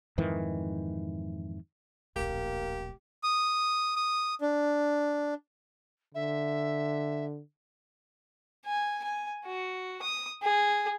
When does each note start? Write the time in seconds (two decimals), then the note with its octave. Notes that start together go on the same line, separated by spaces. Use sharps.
0.18 F2 G#2 D#3 E3
2.16 D1 A#1 A#3 G4
3.23 D#6
3.96 D#6
4.41 D4
6.15 D3 E5
8.66 G#5
9.04 G#5
9.45 F#4
10.02 D#6
10.43 G#4